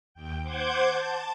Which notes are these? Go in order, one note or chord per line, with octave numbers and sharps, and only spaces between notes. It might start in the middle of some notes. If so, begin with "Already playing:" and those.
D#2 G5
C5 F#5 D6 G6 G#6
A5